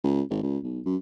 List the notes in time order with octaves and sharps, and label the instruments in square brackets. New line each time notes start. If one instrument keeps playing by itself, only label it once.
[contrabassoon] C#2
G#1
C#2
B1
F#2